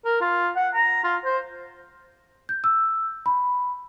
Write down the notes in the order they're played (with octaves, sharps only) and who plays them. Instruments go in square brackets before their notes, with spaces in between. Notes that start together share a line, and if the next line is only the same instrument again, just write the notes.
[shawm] A#4
F4
F#5
A#5
F4
C5
[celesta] G6
E6
B5